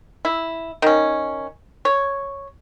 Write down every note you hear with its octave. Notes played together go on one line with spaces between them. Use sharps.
E4
D#3 C#4
C#5